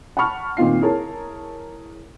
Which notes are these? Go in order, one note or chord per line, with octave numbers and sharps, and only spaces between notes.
F#5 A5 B5 C#6 F6
A#2 D#3 C4 F4 C7
E4 G#4 A#4 C#5 A5